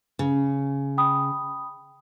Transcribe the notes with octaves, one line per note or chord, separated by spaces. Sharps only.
C#3
G5 B5 D#6